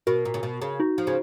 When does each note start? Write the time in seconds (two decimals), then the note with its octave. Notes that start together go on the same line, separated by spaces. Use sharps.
0.07 B2 F#4 A#4
0.25 A#2
0.34 C#3
0.43 B2
0.62 C#3
0.80 D#4 F#4
0.98 F3
1.07 C#3